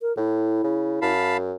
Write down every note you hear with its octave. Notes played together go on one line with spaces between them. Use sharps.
A#4
A2 E4
C#3
F#2 F5 A5 B5